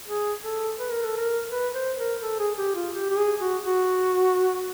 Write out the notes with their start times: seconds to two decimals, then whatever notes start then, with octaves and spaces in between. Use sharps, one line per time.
0.08 G#4
0.44 A4
0.79 B4
0.91 A#4
1.05 A4
1.16 A#4
1.51 B4
1.75 C5
1.98 A#4
2.22 A4
2.40 G#4
2.58 G4
2.75 F4
2.93 G4
3.10 G4
3.18 G#4
3.41 F#4
3.64 F#4